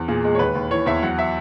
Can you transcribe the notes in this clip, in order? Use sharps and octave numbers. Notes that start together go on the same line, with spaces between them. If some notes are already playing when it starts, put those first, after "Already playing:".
Already playing: E2
A#2 G#4
G#3
C#5
D#2 B4
D#2
E3 C#5
E2 E5
F#3 F#5
E5